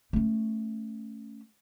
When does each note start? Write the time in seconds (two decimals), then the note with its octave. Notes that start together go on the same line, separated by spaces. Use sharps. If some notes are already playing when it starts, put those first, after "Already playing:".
0.13 A3 C#4